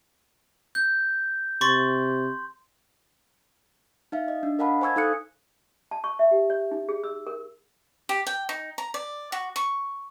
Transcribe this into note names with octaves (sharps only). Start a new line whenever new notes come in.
G6
C3 C6 C#6 A6
D#4 E5 F5
D#5
D4
A#4 D#5 F5 F#5 A5 B5
C5 G#5 C#6 E6 G#6
D#4 A4 F5 D#6 F#6 C#7
A5
C#6
E5
G4
C#5
D#4
G#4
E6
A#4
G4
G5
D#4
A#5
D5
F#4
C#6